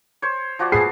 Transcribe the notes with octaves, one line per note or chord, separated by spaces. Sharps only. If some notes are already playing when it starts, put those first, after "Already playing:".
C5 C#5
F3 F#4 D5
B3 G#4 A4 C7